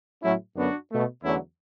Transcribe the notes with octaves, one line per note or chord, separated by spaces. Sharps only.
A2 F#3 A3 C#4 E4
F#2 D3 F#3 B3 D4 F#4
B2 A3
E2 D3 F#3 A3 C#4 E4